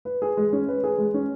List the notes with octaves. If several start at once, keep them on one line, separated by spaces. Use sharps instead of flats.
B4
G#4
G#3
C#4
B4
G#4
G#3
C#4